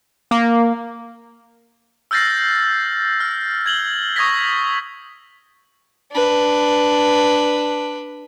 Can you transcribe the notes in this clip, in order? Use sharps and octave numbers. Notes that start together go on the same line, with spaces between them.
A#3
E6 F6 G6 A6 A#6 C7
F6
G#6 F#7 G7
C#6 D#6 G#6 A#6 B6
D4 B4